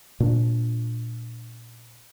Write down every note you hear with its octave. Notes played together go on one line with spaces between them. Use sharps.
A#2 D4